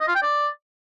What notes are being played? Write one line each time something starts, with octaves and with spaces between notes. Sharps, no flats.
D#5
F4
G5
D5